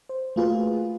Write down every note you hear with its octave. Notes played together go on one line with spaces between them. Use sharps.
C5
A3 A#3 F4 F#4 G#4 B4